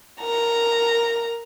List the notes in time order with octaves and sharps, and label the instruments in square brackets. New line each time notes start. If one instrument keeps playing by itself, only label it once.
[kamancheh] A#4 A#5